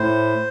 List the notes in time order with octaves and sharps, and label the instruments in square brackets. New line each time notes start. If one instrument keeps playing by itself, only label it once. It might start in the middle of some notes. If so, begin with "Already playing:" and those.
Already playing: [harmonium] A2 C5